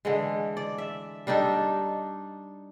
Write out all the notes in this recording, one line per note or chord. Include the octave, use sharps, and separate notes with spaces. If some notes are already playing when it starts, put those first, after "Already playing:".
D3 E3 G#3
D5
E5
G3 D4 D#4 A4